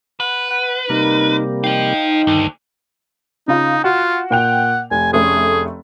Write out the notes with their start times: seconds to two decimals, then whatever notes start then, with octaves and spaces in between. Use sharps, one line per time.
0.20 B4 F#5
0.51 F#5
0.90 C3 G3 A#3 D#4 A#4
1.64 D#4 C5 F5 G5
2.27 D2 G2 D#3
3.48 C#3 D#4 F4
3.84 F4 F#4
4.31 A#2 F#5 G5 F7
4.91 F1 G#5
5.13 F1 A3 C#4 G#4